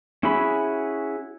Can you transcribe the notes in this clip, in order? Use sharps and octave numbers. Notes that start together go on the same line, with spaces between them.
C#4 E4 F#4 G#4 B5